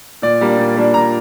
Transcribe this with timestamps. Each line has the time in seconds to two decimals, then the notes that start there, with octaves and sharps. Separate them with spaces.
0.22 A#2 D5
0.41 G3 A#3 D4
0.58 A#2
0.76 G3 A#3 D4
0.94 A#2 A#5